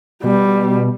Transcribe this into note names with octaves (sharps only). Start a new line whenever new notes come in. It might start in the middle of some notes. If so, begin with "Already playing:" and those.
B2 G3